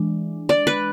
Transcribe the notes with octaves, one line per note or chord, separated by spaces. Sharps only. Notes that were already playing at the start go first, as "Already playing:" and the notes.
Already playing: E3 G#3 D4
D5
B4